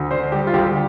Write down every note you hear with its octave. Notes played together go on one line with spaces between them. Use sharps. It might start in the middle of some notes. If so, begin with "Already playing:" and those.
Already playing: D2
D3 C5
G3 G4
F4
D2 G4